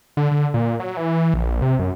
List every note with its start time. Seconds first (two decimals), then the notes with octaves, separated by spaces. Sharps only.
0.17 D3
0.31 D3
0.54 A#2
0.80 F#3
0.97 E3
1.34 A#1
1.62 C3
1.79 F#2